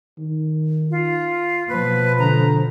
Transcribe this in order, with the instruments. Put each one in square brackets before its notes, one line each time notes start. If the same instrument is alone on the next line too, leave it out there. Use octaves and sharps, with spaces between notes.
[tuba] D#3
[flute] F4
[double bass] B2 F3 [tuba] A#3 [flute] B4
[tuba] D3 [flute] A#5